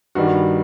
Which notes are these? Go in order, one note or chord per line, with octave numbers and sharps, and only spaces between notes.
G2 D#3 G3 F#4